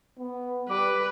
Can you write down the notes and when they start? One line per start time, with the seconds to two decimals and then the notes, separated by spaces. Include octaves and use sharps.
0.19 B3
0.69 G3 B4 D6